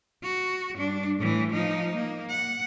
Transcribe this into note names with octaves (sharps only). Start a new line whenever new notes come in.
F#4
G2 D4
A2 E3
F3 D#4
A#3
F#5